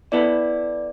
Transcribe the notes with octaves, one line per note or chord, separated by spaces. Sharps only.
B3 E4 A4 D5